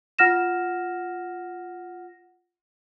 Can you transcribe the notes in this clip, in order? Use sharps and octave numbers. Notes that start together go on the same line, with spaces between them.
F4 F#5 F6 A#6 E7